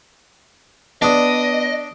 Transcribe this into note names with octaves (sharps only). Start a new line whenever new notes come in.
B3 D4 D5 D#5 D#6